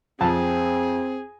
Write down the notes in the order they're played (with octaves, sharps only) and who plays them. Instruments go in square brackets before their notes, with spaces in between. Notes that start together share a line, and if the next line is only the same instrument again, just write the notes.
[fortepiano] F2 A5 [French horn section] C4 [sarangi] G#4